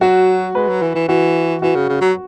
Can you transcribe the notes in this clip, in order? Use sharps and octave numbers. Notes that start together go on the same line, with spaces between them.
F#3 F#4
G#3 B4
F#3
E3
E3
E3 F#4
E3 F#4
C#3
C#3
F#3